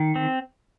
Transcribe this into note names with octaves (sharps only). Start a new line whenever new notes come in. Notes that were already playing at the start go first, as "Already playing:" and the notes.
Already playing: D#3
C4